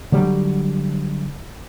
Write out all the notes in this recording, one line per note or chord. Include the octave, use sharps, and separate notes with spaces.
D3 F#3 G3